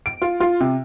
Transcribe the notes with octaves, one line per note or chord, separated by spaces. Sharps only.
D7
F4
F4
C3